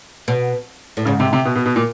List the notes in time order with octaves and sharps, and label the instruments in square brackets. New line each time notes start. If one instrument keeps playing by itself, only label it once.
[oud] B2
A2
[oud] G#2 [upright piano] C#3
[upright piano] C3
C3
B2
B2
B2
A#2